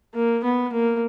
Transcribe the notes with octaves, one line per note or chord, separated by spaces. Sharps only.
A#3
B3
A#3